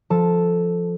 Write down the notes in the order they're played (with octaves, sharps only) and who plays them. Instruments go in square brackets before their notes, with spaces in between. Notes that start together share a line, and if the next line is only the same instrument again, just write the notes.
[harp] F3 A4 A5